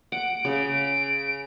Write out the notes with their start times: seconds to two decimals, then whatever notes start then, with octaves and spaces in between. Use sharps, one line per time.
0.12 F#5 D7
0.45 C#3